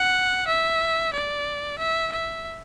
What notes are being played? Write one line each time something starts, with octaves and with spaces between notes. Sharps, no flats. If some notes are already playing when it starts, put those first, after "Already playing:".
Already playing: F#5
E5
D5
E5
E5